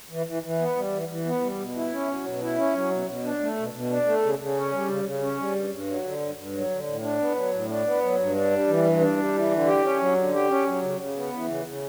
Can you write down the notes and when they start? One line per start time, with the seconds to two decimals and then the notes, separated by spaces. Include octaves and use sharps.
0.10 E3
0.26 E3
0.43 E3
0.59 B3
0.76 G3
0.93 E3
1.08 E3
1.26 B3
1.41 G3
1.59 B2
1.76 E4
1.92 C#4
2.08 F#3
2.24 B2
2.41 E4
2.57 C#4
2.74 F#3
2.90 B2
3.07 B2
3.23 D4
3.40 A3
3.57 B2
3.73 B2
3.90 D4
4.06 A3
4.22 C#3
4.38 C#3
4.55 C#4
4.72 G3
4.88 C#3
5.04 C#3
5.21 C#4
5.38 G3
5.54 G2
5.71 G2
5.87 F#3
6.04 D3
6.20 G2
6.36 G2
6.53 F#3
6.70 D3
6.87 A2
7.02 D4
7.20 B3
7.36 F#3
7.53 A2
7.69 D4
7.85 B3
8.02 F#3
8.19 G2
8.35 D4
8.51 G3
8.67 E3
8.84 G2
9.01 D4
9.17 G3
9.33 E3
9.51 D3
9.67 G4
9.83 C#4
10.00 F#3
10.16 D3
10.33 G4
10.49 C#4
10.66 F#3
10.82 C#3
10.98 C#3
11.15 B3
11.32 E3
11.48 C#3
11.65 C#3